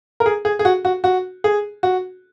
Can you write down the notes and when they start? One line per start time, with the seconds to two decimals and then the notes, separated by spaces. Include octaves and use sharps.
0.20 A#4
0.26 G#4
0.45 G#4
0.59 G#4
0.65 F#4
0.85 F#4
1.04 F#4
1.44 G#4
1.83 F#4